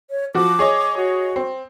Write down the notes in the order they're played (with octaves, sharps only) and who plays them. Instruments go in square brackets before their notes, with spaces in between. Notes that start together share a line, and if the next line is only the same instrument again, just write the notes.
[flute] C#5
[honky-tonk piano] F3 F#4 [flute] D6
[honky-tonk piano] G#4 C#5 D#5
[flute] F#4
[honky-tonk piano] C4